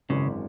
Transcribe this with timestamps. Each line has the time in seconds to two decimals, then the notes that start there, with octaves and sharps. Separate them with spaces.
0.09 G#1 F#2 C#3 E3 G#3 D4